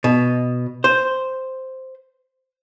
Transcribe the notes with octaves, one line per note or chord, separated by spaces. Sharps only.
B2
C5